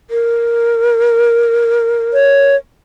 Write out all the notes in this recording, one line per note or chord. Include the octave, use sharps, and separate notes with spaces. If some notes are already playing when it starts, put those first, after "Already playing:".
A#4
C#5